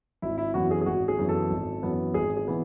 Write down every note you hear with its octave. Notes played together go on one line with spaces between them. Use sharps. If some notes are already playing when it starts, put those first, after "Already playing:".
G#1 E4
E4
F#2 E3 B3 F#4
G#4
G#4
G#1 F#4
G#4
F#2 E3 B3
A4
G#1
F#2 E3 B3
G#1 G#4
G#4
E3 B3